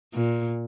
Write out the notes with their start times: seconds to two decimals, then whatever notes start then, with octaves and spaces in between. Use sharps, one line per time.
0.14 A#2